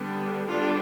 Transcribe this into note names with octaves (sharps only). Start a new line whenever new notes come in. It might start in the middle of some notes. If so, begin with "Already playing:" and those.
Already playing: D3 G3 B3 D4
D3 G3 B3 D4 F4